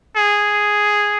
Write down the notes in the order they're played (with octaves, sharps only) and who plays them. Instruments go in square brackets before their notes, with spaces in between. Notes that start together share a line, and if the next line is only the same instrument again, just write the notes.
[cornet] G#4